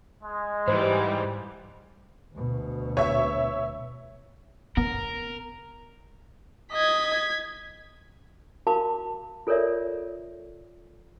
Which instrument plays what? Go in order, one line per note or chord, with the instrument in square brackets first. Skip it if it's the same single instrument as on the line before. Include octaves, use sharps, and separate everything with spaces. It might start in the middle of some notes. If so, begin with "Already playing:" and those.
[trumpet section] G#3
[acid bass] G#2 [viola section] E3 G3 [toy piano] C5
[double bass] D2 B2
[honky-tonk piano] C#5 E5
[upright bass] C#3 [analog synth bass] B3 [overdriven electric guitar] A#4
[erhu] D#5 [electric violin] G#6 B6
[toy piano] F#4 A#4 F5 A5 B5 D6
F4 A4 A#4 C#5 D5 E5